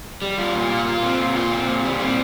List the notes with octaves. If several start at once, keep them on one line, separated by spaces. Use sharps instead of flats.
G3
F4
A#2
F4
F4
C4
A#2
F4
C4
A#2
G3
C4